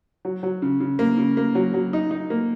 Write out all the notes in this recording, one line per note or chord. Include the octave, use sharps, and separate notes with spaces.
F#3
F#3
C#3
C#3
A#3
C#3
A#3
F#3
F#3
D#4
D#4
A#3